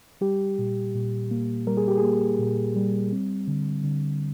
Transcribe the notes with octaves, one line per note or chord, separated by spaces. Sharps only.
G3 G4
A#2
A#2
A#3
G3 A#4
G#4
G4
G#4
A#3
A#2
G3
C4
D3
D3